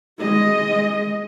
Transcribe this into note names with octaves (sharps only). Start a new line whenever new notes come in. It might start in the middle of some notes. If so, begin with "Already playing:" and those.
G#3 D#5